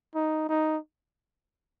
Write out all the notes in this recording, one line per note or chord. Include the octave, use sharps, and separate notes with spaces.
D#4
D#4